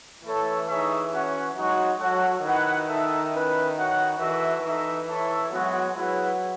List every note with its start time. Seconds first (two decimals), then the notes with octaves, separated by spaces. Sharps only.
0.24 E3 A3 E4 A4 C#5
0.69 D#4 G#4 C#5 E5
1.13 C#4 F#4 C#5 F#5
1.57 F#3 G#3 D#4 F#4
2.00 F#3 F#4 A4 C#5 F#5
2.44 D#3 E4 B4 F#5
2.89 D#4 A4 E5
3.33 C#4 E4 B4
3.76 F#4 C#5 F#5
4.20 E3 F#4 A4 E5
4.65 E3 D#4 A4 E5
5.08 E4 A4 C#5 E5
5.53 F#3 G#3 B3 F#4
5.97 F#3 E4 G#4 B4